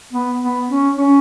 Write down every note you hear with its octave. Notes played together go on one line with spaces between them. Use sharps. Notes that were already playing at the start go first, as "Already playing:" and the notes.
B3
B3
C#4
C#4